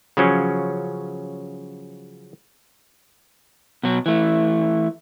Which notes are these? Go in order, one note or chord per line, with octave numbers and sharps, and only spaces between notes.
C#3 F3 F#3 C#4
B2 F#3
E3 A3